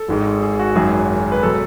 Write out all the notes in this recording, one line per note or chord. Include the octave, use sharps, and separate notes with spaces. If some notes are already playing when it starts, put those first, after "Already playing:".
Already playing: A4
G#1 G#2 D#3 G#3
G#4
F#4
G#1 F#2 D#3 F#3 G#4
B4
B2 F#3 A4